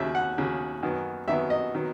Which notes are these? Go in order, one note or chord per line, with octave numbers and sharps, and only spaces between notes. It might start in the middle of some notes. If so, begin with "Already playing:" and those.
Already playing: D#2 C#3 F#3 E5
F#5
D#2 C#3 F#3
F#2 D#3 F#3 B3
F#2 D#3 F#3 B3 E5
D#5
D#3 F#3 B3